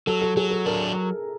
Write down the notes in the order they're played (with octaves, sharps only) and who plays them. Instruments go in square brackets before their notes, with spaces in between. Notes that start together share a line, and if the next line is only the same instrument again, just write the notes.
[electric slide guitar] F#3 [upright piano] A4
[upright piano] A4
[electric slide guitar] F#3 [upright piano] G#4
[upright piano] A4
[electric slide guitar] D4 [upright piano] A#4